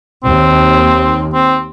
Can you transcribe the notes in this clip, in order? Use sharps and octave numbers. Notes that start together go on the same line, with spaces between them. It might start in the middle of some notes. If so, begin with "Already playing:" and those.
D#2 C4
C4